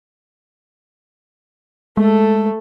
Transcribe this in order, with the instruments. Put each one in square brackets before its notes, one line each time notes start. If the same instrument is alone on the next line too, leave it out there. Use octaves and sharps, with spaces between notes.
[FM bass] G#3 [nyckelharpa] A3 A4